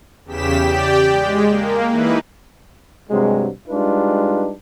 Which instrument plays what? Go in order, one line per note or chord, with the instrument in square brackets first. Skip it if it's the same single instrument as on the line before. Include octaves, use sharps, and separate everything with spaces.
[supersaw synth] E2 C#3 G4 B6 E7
G4 D5 G5
G#3
A#3
E3 D#4 E4 B4
[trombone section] G2 C3 F#3 G#3
G3 G#3 D4 D#4 F4 B4